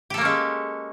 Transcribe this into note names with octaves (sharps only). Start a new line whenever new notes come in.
G#3 A#3 C#4 G4 A4